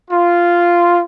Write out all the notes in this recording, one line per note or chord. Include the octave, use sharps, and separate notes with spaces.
F4